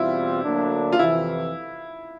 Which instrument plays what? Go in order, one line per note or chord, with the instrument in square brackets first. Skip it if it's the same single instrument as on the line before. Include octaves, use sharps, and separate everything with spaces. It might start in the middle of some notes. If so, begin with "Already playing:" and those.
Already playing: [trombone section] E2 B2 G3 C4 F4 [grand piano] E4
[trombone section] D2 D3 F#3 A#3 D4
[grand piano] F4
[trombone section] F2 C3 E3 [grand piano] E4